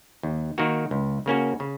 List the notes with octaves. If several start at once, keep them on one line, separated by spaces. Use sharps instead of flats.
D#2
D#3 A#3 F#4
C#2
C#3 A#3 C#4 F#4
C#3